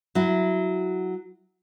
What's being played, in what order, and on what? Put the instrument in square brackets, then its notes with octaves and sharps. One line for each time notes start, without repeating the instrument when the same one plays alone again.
[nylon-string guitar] F#3 E4